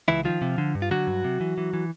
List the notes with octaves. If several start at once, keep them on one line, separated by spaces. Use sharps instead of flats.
C#2 E3 E4
D#3 F3 F4
C3
D3
G2
F4
D3 F#3 F#4
G2
C3
E3
E3
E3